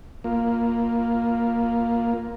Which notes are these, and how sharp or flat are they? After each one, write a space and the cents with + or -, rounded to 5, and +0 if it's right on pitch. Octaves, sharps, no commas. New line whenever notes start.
A#3 +0 F4 +0